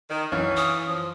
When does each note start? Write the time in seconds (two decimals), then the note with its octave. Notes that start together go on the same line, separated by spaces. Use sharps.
0.09 D#3
0.32 F#2 E3 C#5 F5
0.57 D#6
0.89 F3